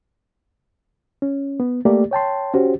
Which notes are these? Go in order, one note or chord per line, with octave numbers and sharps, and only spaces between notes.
C#4
B3
A3 A#3 G4 D5
C#5 G5 A5 C6
C#4 F#4 G4 C5